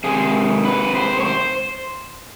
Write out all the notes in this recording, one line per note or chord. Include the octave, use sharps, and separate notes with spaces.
C3 D#3 G#3 G#4
B4
C5
C#5
C5